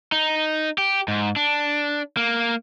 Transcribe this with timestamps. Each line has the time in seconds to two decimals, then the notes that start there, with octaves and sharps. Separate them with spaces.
0.12 D#4
0.78 G4
1.08 G#2
1.36 D4
2.17 A#3